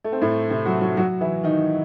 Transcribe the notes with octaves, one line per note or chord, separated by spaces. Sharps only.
A3
C4
A2 A3
C3 C4
F#3 F#4
F#3 F#4
F#3 F#4
E3 E4
D#3 D#4